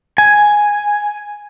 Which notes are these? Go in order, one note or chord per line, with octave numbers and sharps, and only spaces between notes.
G#5